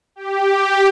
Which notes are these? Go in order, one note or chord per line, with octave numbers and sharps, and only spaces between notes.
G4